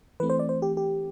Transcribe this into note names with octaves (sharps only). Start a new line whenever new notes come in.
E3 A3 C4 B4
C5
D5
C5
G4
G4